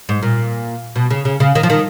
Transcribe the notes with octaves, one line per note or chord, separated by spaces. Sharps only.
G#2
A#2
B2
C#3
C#3
C#3
D#3
F3
D#3